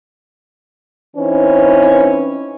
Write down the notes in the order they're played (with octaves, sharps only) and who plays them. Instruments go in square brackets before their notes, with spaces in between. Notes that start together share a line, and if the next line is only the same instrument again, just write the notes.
[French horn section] E3 C4 C#4 D#4 B4